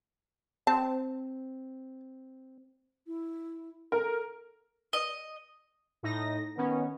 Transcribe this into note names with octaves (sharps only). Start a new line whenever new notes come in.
C4 A5
E4
A4 A#4
D#5
A2 D#4 A#6
D#3 B3 C#4